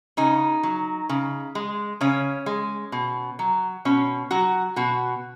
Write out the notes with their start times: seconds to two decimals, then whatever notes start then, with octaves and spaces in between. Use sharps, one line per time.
0.17 C#3 D#4
0.63 F#3
1.09 C#3
1.55 G#3
2.01 C#3 C#4
2.46 G#3
2.92 B2
3.39 F#3
3.85 B2 C#4
4.31 F#3 F#4
4.76 B2 F#4